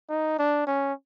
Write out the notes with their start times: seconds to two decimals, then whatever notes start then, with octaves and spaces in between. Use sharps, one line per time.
0.09 D#4
0.39 D4
0.67 C#4